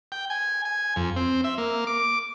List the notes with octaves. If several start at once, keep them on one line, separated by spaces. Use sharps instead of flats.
G5
G#5
G#5
F2
C4
E5
A#3
D6